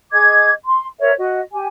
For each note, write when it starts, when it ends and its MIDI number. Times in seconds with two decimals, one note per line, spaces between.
0.12 0.51 68
0.12 0.51 75
0.12 0.51 86
0.12 0.51 92
0.65 0.87 84
1.00 1.12 70
1.00 1.12 72
1.00 1.12 73
1.00 1.12 76
1.18 1.41 66
1.18 1.41 75
1.52 1.67 67
1.52 1.67 80